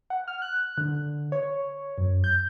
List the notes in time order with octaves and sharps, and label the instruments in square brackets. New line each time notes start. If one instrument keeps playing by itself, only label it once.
[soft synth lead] F#5
F6
F#6
D3
C#5
F#2
G6